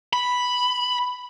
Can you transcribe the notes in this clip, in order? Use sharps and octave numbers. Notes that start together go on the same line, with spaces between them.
B5